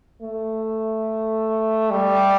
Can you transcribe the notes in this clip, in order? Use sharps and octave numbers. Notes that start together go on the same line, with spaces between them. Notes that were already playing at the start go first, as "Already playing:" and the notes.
A3
G3